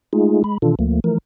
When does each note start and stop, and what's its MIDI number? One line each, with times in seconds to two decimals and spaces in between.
0.13 0.43 56
0.13 0.43 57
0.13 0.43 63
0.13 0.43 65
0.13 0.43 68
0.44 0.58 56
0.44 0.58 83
0.62 0.75 47
0.62 0.75 51
0.62 0.75 52
0.62 0.75 62
0.62 0.75 65
0.62 0.75 69
0.79 1.00 38
0.79 1.00 53
0.79 1.00 57
0.79 1.00 58
1.04 1.18 52
1.04 1.18 53
1.04 1.18 57
1.04 1.18 70